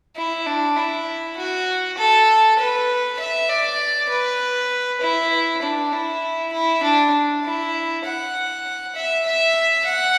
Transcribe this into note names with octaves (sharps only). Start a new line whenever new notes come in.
E4
D4
E4
F#4
A4
B4
E5
D5
B4
E4
D4
E4
E4
D4
E4
F#5
E5
E5
F#5